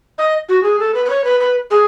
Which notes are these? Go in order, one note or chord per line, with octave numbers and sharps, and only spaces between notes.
D#5
F#4
G#4
A4
B4
B4
C#5
B4
B4
G#4